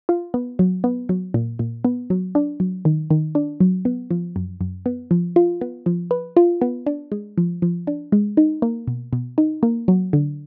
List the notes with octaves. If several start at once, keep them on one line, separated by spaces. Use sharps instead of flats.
F4
B3
F#3
B3
F#3
A#2
A#2
B3
F#3
D4
F#3
D#3
D#3
D4
F#3
B3
F3
F#2
F#2
B3
F3
F4
B3
F3
B4
F4
B3
D4
G#3
F3
F3
D4
G#3
D#4
A#3
B2
B2
D#4
A#3
F#3
D3